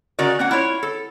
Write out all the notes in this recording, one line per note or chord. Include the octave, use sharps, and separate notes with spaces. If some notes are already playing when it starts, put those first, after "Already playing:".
C#3 F#4 A#4 D5
A#3 C#4 F#5
E4 F4 C#5
A4